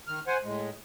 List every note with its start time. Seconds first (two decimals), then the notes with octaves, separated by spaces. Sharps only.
0.07 D#3 F6
0.27 C5 F#5 G#5
0.44 A2 G#3